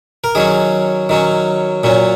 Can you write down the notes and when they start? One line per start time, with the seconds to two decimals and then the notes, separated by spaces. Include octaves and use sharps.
0.24 A#4
0.35 D#3 F#3 C#4 G#4
1.09 D#3 F#3 C#4
1.84 A#2 F#3 C#4